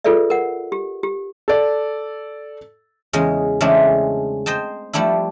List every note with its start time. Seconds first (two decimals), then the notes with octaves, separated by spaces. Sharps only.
0.04 F4 G#4 A4 B4 D5 E5
0.30 A#4 F#5
0.72 G4
1.03 G4
1.48 A4 D5
3.13 E2 C#3 G#3 D#5
3.61 C#3 E3 G#3 A3 C4 D4
4.46 C5 D#5 G5 A5
4.93 F3 G3 A3 D4 E4